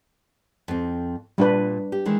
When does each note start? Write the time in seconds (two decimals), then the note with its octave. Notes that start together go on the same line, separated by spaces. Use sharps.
0.68 F2 C4
1.38 A#2 G3 D4 B4
1.92 G4
2.06 D#3 E3 G#3